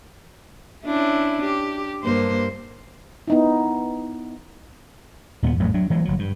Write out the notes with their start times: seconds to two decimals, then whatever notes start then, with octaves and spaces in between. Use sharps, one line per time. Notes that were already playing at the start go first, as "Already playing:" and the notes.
0.85 C#4 D4 E4
1.45 G4
2.03 G2 A#3 C5
3.28 B3 D#4 E4
5.43 D#2 A#2 G#3 B3
5.60 A1 F2 A2 F#3
5.74 F#3 D4
5.90 E3 F#3 G#3 A#3
6.05 G1 F#3
6.19 G2